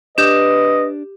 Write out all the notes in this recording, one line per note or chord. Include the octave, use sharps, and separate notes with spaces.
D4 G4 B4 D#5 G6 E7